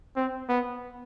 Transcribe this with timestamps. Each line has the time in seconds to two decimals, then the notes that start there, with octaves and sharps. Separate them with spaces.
0.16 C4
0.49 B3